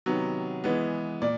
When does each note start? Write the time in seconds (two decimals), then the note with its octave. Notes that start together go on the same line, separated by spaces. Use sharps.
0.06 C3 D#3 F#3 B3
0.64 E3 G#3 B3
1.22 A#2 D5